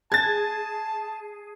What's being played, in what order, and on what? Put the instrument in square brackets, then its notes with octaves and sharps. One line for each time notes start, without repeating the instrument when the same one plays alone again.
[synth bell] G#4 [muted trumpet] A5 [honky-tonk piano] G#6 A6